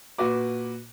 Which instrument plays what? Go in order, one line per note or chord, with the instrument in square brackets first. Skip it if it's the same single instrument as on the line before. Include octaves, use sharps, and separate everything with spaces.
[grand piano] A#2 F#4 B4 D6